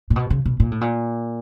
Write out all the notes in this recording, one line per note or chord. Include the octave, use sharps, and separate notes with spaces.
A#2
B2
C#3
B2
A#2
A2
A#2